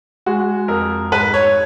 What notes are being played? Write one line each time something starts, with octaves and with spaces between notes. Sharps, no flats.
G#3 F#4
F2 A#4
G#2 B4
C#5